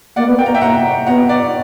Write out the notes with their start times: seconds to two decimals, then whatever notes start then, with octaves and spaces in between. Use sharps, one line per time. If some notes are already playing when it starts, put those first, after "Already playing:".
0.16 A#3 D5 F#5
0.27 B3
0.39 A#3 G5
0.46 A#5
0.55 E5 G5
0.61 F#5 A#5
1.07 B3 F#5 A#5
1.29 D5 F#5